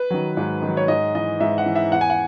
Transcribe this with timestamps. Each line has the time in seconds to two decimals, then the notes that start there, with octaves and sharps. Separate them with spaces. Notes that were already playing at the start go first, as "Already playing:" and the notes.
Already playing: B4
0.10 D#3 F#3
0.37 G#2
0.62 D#3 F#3
0.77 C#5
0.88 G#2 D#5
1.15 E3 D#5
1.40 G#2 E5
1.58 F#5
1.66 E3
1.76 E5
1.92 E2 F#5
2.01 G#5
2.10 F#5